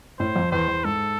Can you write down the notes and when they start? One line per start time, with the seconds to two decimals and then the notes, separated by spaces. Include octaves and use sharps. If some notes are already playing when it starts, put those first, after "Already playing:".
0.19 A2 C5
0.36 F2
0.52 E2 C5
0.68 E2
0.84 G#2 A4